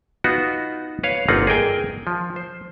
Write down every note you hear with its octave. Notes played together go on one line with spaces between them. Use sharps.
B3 D#4 F4 F#4
B4 C#5 F5
G1 A#3 C4 D#4 F4 F#5
G#4 A#4 G5 G#5
F3
C5